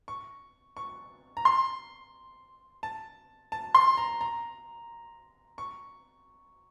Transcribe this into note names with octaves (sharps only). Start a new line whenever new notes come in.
C#6
C#6
A#5
C6
A5
A5
C6
A#5
A#5
C#6